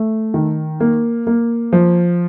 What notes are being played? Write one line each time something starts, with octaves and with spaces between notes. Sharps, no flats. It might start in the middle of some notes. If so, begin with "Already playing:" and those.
Already playing: A3
D#3
A#3
A#3
F3